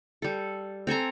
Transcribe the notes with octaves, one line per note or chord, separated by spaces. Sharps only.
G3 A4
C4 A4 G#5 A#5